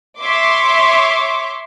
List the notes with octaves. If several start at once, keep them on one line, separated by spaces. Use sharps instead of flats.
C#5 E5 C6 D6